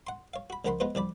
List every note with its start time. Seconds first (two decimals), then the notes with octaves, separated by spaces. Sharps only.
0.07 F#5 C6
0.34 C#5 F5
0.50 F#4 B5
0.65 C#2 F3 A#4 F#5 B5 C6
0.80 G#3 B3 F4 B4 C5
0.95 C2 F3 D5 B5